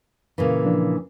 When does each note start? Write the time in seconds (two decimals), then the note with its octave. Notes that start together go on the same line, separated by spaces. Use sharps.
0.38 A#2 C#3 E3
0.64 F3 D4